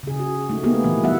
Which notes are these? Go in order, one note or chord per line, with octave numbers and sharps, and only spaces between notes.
C#3 G#4
F#4
A3 D#4
A#3 B3 G4 G#4
A#2 E3 A#3
G3 B3 F#4 G#4 E5 F#5